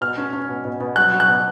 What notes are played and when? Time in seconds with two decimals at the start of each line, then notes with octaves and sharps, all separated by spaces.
0.01 B2 F6
0.18 C#4
0.33 C#4
0.49 B2
0.65 B2
0.80 B2
0.96 F#3 F#6
1.12 F#3
1.20 F#6
1.28 B2